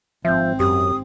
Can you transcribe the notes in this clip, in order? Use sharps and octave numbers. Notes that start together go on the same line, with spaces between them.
G#1 F3 C4 E5 E6 G6
F#2 G4 D#6